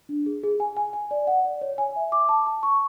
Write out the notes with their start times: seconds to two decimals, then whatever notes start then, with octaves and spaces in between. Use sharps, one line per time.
0.09 D4
0.26 G#4
0.44 G#4
0.60 G#5
0.77 G#5
0.93 G#5
1.11 D5
1.27 F#5
1.45 D5
1.61 C#5
1.78 G#5
1.96 E5
2.12 D6
2.29 A5
2.46 A5
2.63 C#6